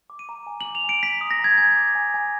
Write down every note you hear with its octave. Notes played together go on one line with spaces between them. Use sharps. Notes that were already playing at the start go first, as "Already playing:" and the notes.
D6
D#7
A#5
G#5
F#7
D6
F7
G#5 D7
A#5 B6
D#6
A#6
A#5 G#6
G#5 G#6
D6
G#5
G#5